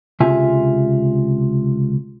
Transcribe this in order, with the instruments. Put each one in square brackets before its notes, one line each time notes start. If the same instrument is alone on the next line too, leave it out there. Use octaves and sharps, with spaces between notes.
[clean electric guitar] C#2 C3 F4 E5 G#5